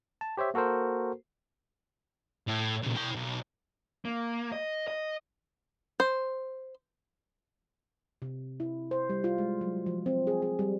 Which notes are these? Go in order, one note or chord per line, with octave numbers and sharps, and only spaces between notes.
A5
G4 C5 C#5 E5
A#3 F#4 A4 A#4 C5
A2
A#2 C#3
E4 G5
B1
A#3
D#5
D#5
C5
C3
E4
C5
G3
F4
G#3
F#3
F3
C4
G#4
G#4
G3